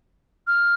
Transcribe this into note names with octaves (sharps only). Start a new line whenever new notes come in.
F6